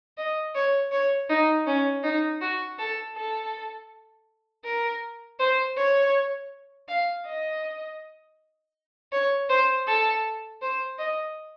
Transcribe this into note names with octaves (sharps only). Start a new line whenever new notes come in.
D#5
C#5
C#5
D#4
C#4
D#4
F#4
A4
A4
A#4
C5
C#5
F5
D#5
C#5
C5
A4
C5
D#5